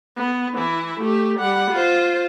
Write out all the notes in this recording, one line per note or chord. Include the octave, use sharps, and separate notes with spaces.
B3
E3 E4
A3 G4
G3 F#5
F4 C5